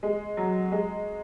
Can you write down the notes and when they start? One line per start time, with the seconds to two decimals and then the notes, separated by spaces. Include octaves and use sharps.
0.03 G#3
0.37 F#3
0.72 G#3